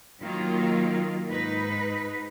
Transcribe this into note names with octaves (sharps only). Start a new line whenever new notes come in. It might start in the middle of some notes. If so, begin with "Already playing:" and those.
D#3 F#3 A#3 F4
G#2 D#4 B4